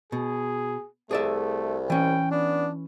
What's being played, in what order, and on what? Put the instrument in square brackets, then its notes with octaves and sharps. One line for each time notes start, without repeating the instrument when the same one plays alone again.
[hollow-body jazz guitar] B2 [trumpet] G#4
[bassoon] C2 [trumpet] A3 [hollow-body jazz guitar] G#4 D5 E5
[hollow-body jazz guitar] E3 C#4 [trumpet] G5
[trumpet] B3 [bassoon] D4